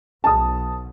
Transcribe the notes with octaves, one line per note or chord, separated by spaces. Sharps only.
B1 A5 D#6